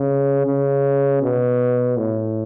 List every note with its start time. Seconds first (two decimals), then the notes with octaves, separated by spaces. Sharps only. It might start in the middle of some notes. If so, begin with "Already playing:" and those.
Already playing: C#3
0.47 C#3
1.22 B2
1.97 A2